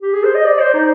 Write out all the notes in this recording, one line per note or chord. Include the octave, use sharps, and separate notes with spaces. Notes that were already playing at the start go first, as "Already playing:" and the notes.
G4
G#4
C5
D#5
D5
C5
D#4